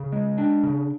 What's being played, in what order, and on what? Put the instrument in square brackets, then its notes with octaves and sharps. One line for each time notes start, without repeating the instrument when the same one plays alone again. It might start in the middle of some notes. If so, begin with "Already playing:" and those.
Already playing: [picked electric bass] C#3
G#3
D4
C#3